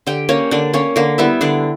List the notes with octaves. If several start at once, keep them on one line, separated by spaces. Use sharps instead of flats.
D3 G4 G5
A#3 C#4 C#5
D3 D4 D5
A#3 C#4 C#5
D3 A#3 A#4
G3 B3 E4 E5
D3 D4 D5